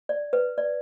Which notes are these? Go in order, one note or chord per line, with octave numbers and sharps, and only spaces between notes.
D5
B4
D5